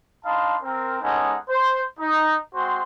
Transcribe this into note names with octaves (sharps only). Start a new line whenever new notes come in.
D4 D#4 F5 A5 B5 C6
C4 A#4
G#3 B3 C#4 D#4 A4 F#5
C5
D#4
G#3 C4 F#4 C5 C6